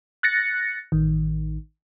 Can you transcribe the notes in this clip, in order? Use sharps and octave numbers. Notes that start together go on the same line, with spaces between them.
F#6 A6 A#6 C#7
A1 D#3